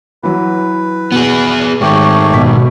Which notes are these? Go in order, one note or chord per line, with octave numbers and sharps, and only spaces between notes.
E3 F#3 B4
B2 B3 G#4
G#2 D#3 A3 G4 C#5
B2 B6